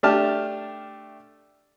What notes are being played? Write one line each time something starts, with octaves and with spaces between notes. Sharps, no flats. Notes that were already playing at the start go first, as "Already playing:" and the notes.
A3 D4 G4 A5 F6